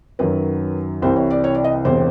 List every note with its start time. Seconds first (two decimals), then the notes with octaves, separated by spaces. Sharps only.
0.19 F#2 D#3 F#3 B4
1.02 C2 C3 E3 C5
1.16 C#5
1.30 D5
1.44 C#5
1.54 D5
1.64 D#5
1.85 E1 E2 C3 C5